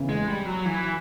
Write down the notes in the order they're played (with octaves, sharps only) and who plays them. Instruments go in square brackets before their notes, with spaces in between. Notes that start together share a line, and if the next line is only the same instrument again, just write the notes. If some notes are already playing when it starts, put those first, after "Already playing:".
Already playing: [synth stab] E2 C#3 E3
[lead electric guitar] G#3
G3
F#3
E3